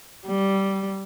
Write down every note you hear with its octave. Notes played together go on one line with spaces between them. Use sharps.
G3